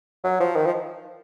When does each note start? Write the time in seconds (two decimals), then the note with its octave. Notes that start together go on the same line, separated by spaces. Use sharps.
0.24 F#3
0.40 F3
0.56 D#3
0.66 F3